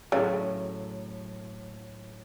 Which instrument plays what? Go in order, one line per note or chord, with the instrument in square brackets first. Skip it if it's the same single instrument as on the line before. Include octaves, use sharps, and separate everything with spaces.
[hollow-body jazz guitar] A2 F#3 A3 [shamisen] C#3